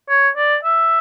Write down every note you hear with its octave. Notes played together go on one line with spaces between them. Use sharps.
C#5
D5
E5